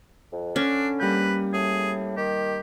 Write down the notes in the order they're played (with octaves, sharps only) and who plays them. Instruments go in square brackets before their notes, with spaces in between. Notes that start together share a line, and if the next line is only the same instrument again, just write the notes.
[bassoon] F2
[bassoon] D3 [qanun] C#4 [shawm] D4
[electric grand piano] G3 A#3 G6 [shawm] B4
[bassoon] A2 [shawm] G#4
[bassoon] D#3 [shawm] G4